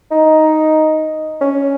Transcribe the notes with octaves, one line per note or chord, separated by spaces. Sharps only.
D#4
C#4